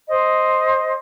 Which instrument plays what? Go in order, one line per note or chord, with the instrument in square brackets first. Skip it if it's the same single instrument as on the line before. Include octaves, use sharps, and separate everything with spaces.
[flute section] C5 D#5